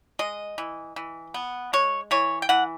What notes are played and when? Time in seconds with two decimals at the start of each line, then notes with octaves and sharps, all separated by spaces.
0.19 G#3 D#5
0.58 E3
0.96 E3
1.34 B3
1.73 G#3 C#5
2.11 E3 C#5
2.42 G5
2.49 E3 F#5